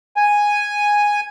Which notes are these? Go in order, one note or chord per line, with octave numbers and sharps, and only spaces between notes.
G#5